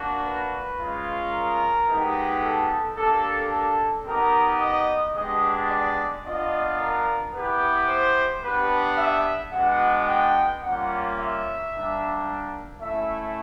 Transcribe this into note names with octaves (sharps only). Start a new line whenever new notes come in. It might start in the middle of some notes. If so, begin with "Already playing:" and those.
Already playing: A#3 D4 F#4
B4
G#3 C#4 F4
A#4
G#3 B3 D#4 G4
A4
A#3 D4 G4 A4
A4
B3 D#4 G4 A#4
D#5
G#3 B3 D4 G4 D#5
D5
B3 D4 F4 D#5
A#4
B3 E4 G4 B4
C5
B3 D4 G4 B4
E5
G#3 B3 D4 F#4 F#5
G5
G3 A#3 C#4 F4 F#5
E5
G3 A#3 D4
A3 C#4 E4 E5